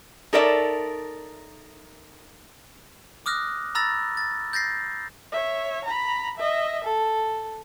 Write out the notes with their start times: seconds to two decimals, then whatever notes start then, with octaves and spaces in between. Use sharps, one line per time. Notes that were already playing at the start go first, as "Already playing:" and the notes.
0.33 D#4 A4 A#4 C#5 D5 E5
3.26 D6 D#6 F6 F#6 A#6
3.75 A#5 B5 E6 A6 A#6
4.17 A6
4.53 G6 A6 A#6 C7
5.32 C#5 E5
5.85 A#5 B5
6.38 D#5 E5
6.84 A4